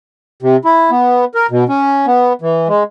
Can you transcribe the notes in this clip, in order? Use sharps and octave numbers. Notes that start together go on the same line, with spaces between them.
C3
E4
B3
A#4
B2
C#4
B3
E3
G#3